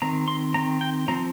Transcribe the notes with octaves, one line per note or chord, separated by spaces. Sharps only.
D#3 C4 A#5
C6
D#3 C4 A#5
G5
F3 C4 A#5